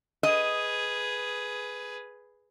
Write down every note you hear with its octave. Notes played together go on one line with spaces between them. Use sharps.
G#4 B4 D#5